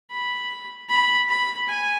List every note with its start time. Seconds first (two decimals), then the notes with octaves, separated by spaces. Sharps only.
0.11 B5
0.89 B5
1.28 B5
1.68 G#5